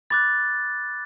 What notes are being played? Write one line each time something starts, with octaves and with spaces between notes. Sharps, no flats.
B5 D6 F#6 A6